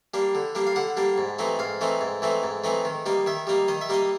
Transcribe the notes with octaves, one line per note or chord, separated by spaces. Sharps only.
G3 A#3 D4
D3
G3 A#3 D4
F5
D3 F#5
G3 A#3 D4
G#2
E3 A3 C4 D#4
G#2 F5
E3 A3 C4 D#4
G#2
E3 A3 C4 D#4
G#2
E3 A3 C4 D#4
D#3
G3 A#3 D#4
D#3 E5
G3 A#3 D#4
D#3 D#5
E5
G3 A#3 D#4 D#5